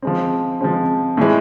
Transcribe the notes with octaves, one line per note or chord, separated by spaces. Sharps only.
F3 G#3 C4
F3 G#3 C4
A2 E3 G#3